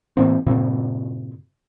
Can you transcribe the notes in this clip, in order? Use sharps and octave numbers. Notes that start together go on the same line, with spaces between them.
A2 E3 A#3 C4
G2 A#2 C#3 C4